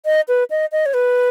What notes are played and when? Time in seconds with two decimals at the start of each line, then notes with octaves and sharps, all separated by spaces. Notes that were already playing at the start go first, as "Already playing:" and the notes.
0.05 D#5
0.28 B4
0.50 D#5
0.72 D#5
0.86 C#5
0.94 B4